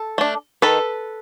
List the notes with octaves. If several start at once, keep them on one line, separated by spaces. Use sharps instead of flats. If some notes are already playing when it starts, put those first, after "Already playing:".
Already playing: A4
A3 D4
D#3 A4 B4